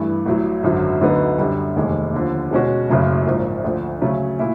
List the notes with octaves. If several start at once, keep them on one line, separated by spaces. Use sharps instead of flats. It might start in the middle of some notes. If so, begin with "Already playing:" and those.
Already playing: G2 E3 A3
A1 A2 F#3
G#1 F#2 D3 F#3
D2 D3 F#3 B3 D#4
F#2 D3 G3
F1 D#2 D#3 G#3
D#2 D3 F3
B2 G#3 C#4 F#4
F#1 F#2 C#3 F#3 A3
A#1 G#2 F3 A#3
D2 D3 F3
C#3 F#3 A3 C#4
A#2 A3 E4